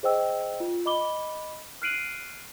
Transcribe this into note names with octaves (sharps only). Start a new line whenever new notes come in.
G#4 C5 D#5 G5 E6
F4
D#5 B5 D6 G7
F6 F#6 C7 D7 D#7 F#7